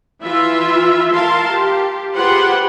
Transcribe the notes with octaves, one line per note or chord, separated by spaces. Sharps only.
E3 F4 E5
A#4 F5 A5 C6
G4
F4 G4 G#4 B4 C5 F#5